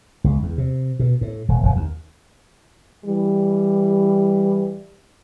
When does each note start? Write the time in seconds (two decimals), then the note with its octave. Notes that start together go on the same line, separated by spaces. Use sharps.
0.24 C#2
0.43 E2
0.58 C3
0.99 B2
1.21 A2
1.48 D#1
1.63 E1
1.76 D#2
3.05 E3 G3